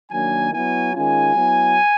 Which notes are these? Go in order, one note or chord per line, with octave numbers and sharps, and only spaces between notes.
D#3 F#3 A#3 D4 G#5
F#3 B3 E4 G#5
D#3 G#3 C#4 F4 G#5
F#3 B3 E4